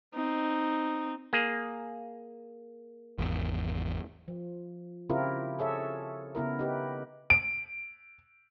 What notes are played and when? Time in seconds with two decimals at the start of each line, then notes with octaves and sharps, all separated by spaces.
0.14 C4 D#4
1.33 A#3 G#4
3.18 G#1 E2
4.28 F3
5.09 C#3 C4 E4 F4 G4 A#4
5.59 G#4 A4 C#5 E5
6.35 C#3 B3 E4 A#4
6.59 D#4 G4 B4
7.30 D7